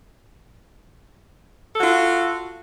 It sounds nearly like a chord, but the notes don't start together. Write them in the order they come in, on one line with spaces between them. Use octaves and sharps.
A4 F#4 F4